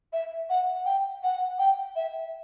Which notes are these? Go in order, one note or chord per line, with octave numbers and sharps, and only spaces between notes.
E5
F#5
G5
F#5
G5
E5